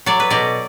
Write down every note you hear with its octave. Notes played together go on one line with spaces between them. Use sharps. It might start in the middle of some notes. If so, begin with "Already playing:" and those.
F#3 D5
B4
B2 D5